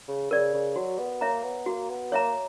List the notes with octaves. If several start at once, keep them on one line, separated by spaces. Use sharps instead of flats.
C#3
C#3 A#4 D5
C#3
F#3 F#4
B3
A#3 C#5 E5 A#5
B3
A#3 F#4
B3
A#3 C#5 E5 A#5